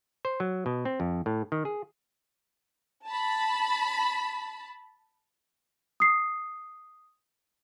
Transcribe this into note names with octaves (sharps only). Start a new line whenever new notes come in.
C5
F#3
B2
C4
F2
A2
D#3
G#4
A5 B5
D#6 C7